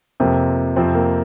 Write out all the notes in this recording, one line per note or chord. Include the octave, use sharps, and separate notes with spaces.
F2 C3 F3 A#3
F2 C3 F3 C4
A#3